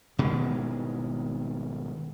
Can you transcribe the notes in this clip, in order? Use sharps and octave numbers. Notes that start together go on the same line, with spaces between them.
G#1 B2 D#3 G#3